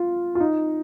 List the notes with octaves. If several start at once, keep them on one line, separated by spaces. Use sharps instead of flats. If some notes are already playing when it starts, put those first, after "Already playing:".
Already playing: F4
F4
D#4